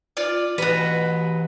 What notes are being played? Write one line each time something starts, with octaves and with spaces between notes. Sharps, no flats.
F4 D5
E3 F#4 G4 B4